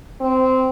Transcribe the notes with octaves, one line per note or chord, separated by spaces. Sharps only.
C4